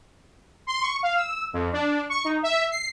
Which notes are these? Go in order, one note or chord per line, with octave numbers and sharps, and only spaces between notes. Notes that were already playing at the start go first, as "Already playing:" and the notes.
C6
C#6
F5
E6
F2
D4
C#6
D#4
E5
C7